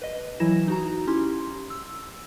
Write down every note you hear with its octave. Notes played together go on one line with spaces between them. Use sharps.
B4 D#5
E3 F#3 E4 A#6 E7
D#4 F#4 A#5
C#4 E4 G4 C6
E6